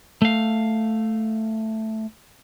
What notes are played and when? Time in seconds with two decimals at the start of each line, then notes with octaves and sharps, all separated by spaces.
0.22 A3 F5